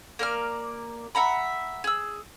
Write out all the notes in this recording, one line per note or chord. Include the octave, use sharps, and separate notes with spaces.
A#3 A#4 D5 F6
E5 F#5 A#5 B5
G#4 E6